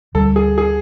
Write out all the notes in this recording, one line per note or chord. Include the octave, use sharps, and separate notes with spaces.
D2 D3 G3 A4
G#4
G#4